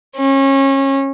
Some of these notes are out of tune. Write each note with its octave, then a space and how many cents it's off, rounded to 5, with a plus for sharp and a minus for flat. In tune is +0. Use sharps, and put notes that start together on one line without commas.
C#4 -30